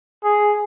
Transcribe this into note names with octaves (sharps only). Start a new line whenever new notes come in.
G#4